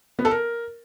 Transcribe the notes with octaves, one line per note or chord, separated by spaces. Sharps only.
B3
A4
A#4